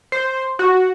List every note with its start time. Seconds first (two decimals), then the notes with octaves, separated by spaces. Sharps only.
0.12 C5
0.59 F#4